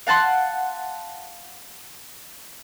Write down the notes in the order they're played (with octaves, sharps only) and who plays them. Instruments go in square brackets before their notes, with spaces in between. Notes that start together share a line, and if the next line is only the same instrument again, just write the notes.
[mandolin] F5 F#5 A5 C6